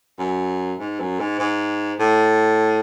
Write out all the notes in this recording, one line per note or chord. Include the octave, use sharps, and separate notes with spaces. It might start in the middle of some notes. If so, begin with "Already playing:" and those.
F#2
G#2
F#2
G#2
G#2
A2